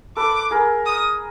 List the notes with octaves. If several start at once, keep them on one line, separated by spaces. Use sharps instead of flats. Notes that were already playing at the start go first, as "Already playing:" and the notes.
A4 B4 D6
G#4 A#4
D#6